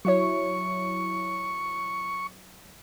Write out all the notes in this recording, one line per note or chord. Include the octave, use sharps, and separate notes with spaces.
F#3 E4 C#5 C#6